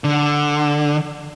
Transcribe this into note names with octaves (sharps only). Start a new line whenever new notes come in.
D3